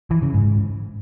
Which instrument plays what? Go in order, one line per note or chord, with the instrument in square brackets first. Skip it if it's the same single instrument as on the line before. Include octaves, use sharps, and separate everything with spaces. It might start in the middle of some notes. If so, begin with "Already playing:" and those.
[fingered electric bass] E3
C#3
G#2